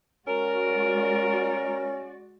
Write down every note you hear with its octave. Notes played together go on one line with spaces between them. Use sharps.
G#3 C#4 F#4 A#4 D5